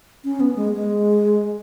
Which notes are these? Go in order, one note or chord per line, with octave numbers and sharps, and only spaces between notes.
C#4
B3
G#3
G#3